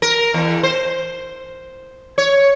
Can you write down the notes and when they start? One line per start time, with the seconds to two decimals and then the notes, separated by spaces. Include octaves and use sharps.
0.02 A#4
0.34 E2
0.63 C5
2.18 C#5